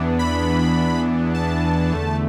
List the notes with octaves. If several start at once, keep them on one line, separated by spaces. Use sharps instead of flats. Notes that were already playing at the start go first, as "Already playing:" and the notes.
Already playing: E2 E3 B3 D4
B5
A5
E2 D3 A3